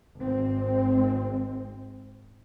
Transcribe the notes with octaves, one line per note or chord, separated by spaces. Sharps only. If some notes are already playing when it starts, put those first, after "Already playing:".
G#1 G#3 C4